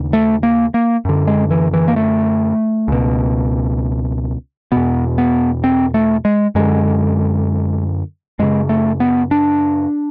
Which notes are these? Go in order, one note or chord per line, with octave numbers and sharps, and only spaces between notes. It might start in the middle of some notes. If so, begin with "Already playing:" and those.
Already playing: D#2 C#3
A3
A#3
A#3
F#2 D3
G#3
E3
E3
A#3
A3
C#2 B2
E2 B2 B3
B3
C4
A3
G#3
F#2 D3 G#3
F#2 C#3 G#3
A3
B3
D4